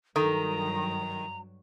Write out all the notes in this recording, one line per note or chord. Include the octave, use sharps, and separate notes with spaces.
G2 D#3 F#3 A4 A#5